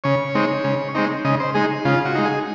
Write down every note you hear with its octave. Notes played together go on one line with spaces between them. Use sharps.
C#3 C#5
G#3 C4 D#4
C#3
G#3 C4 D#4
C#3 D#5
C5
G#3 D#4 G#4
C#3 F4
F#4
G#3 D#4
G#4